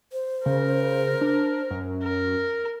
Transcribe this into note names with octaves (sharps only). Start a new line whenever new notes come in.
C5
C#3 A#4
D4
F#2
A#4